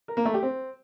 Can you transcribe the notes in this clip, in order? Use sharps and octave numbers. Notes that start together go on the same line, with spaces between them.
A#4
A#3
A3
G4
C4